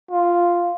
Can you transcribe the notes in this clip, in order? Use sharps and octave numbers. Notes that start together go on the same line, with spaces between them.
F4